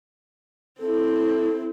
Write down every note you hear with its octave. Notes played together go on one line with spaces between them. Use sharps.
C4 E4 A4